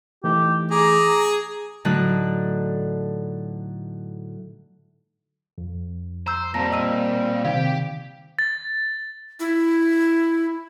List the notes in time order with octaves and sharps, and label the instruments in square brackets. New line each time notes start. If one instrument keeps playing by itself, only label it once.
[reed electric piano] E3 A3 D#4 [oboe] G4
[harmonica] G#4 [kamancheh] A#5 [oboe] D6
[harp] A2 D3 F#3 D#4 F#6
[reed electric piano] F2
[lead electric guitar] C5 [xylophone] A#5 E6 G6
[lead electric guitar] A#2 [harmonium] G3 C4 [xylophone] A5 A#5 A#6
[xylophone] D#5 E6 D#7
[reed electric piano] C3 D#3 [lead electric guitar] G4 G5 [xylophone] F5 G#6
[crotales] A6
[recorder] E4